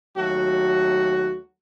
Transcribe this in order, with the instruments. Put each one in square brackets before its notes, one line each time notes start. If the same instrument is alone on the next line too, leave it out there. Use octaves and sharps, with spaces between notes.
[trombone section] D#2 F#3 A3 F#4